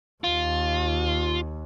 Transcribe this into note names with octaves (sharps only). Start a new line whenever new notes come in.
D#2 F4